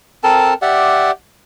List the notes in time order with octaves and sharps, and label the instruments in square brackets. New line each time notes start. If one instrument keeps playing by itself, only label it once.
[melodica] C4 A4 A#4 A5
G4 D5 E5 F#5